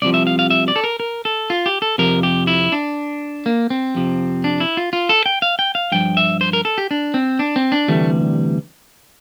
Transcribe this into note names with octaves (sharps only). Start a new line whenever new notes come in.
C2 C3 F3 D5
E5
F5
F5
E5
D5
A4
A#4
A#4
A4
F4
G4
A4
F2 C3 F3 A#4
G4
E4
D4
A#3
C4
F2 C3 F3
D4
E4
F4
F4
A4
G5
F5
G5
F5
G2 F3 G5
E5
C5
A#4
A4
G4
D4
C4
D4
C4
D4
D2 C3 E3 G3 A3